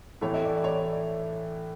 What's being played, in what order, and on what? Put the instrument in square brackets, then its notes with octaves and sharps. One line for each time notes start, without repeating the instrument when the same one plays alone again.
[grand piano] A2 E3 A3 E4 [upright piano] C#5
[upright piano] E5
D5
D5
C#5
D5
D5